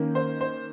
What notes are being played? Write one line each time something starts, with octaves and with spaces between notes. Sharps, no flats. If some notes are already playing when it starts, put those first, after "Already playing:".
Already playing: D#3 A#3 C#4
C5
C5